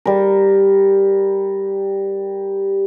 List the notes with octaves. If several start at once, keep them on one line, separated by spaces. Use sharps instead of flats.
G3 A#4